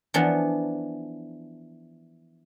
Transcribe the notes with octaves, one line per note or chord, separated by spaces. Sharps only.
E3 F3 B3 D4